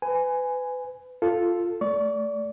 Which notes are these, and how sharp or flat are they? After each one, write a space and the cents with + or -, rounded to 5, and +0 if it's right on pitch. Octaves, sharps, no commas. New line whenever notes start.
B4 +30 G#5 +0
F4 +0 A4 +0
A3 +0 D5 -20 C#6 +15